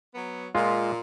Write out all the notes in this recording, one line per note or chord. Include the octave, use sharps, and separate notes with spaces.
F#3 B3
A#2 G#3 F4